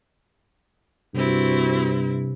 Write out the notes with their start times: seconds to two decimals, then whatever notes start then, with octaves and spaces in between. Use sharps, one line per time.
1.14 G2 C3 C4 E4 F#4